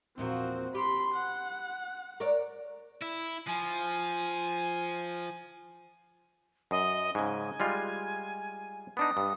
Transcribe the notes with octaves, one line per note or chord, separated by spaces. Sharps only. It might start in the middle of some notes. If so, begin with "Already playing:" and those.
E2 A#2 F3 C4 F#4
G4 B5 C6
F#5
A#4 C#5 D5
E4
F3 G#5
F#2 D#5
G#2 C#3 G#5
G3 G#3 F4
B3 D4 D#4 D#6
G2